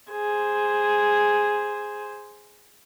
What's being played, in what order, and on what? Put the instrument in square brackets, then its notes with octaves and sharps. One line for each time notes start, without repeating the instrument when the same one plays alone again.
[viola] G#4 C5